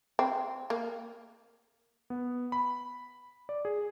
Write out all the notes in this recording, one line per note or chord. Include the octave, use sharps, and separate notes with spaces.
C4
A#3
B3
B5
D5
G#4